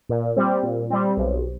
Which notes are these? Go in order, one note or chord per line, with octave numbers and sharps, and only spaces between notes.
A#2
G3 C4
A#2
G3 C4
B1